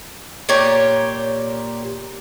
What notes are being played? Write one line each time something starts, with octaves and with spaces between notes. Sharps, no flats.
A#2 G4 C#5